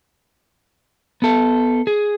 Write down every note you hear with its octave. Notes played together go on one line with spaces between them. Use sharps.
B3 A4
G#4